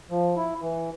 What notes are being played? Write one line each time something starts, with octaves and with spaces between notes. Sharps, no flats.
F3
E4
E3